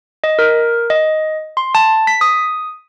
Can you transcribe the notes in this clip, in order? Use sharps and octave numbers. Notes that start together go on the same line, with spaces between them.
D#5
A#4
D#5
C6
A5
B6
D#6